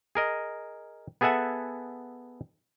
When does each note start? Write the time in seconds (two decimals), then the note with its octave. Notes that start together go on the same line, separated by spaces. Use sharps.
0.15 G#4 A#4 D#5
1.21 B3 G#4 A4 E5 F#5 G#5